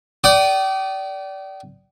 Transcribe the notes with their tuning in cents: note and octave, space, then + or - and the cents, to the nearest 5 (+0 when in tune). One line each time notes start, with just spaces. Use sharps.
D5 -15 G5 -35 D#6 -15